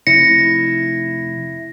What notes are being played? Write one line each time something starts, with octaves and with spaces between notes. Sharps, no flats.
F1 E4 A#6 C#7